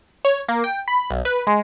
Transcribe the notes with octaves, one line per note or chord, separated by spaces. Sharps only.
C#5
A#3
G5
B5
B1
B4
G#3